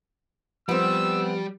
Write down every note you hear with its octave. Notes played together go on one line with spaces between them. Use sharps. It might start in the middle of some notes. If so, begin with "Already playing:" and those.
F3 G3 B3 C4 E6